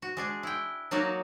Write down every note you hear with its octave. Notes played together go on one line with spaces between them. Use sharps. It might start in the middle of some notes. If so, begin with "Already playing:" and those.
F#4
G#3 D4 G#4
E4 G5
F#3 A#3 D#4 F#4 C#5 D5